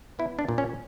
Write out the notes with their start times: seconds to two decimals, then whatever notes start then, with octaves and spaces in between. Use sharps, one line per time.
0.19 B3 E4
0.39 D4
0.49 A#2
0.58 C#4